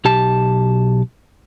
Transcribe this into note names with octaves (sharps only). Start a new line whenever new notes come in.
B1 G4 A5